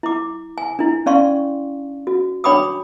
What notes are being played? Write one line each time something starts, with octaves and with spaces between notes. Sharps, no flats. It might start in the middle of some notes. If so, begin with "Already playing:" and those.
E4 D6
G#5
D4 E4
C#4 D5 F5 C6 C#6
F#4
D4 C#5 G5 B5 D6 D#6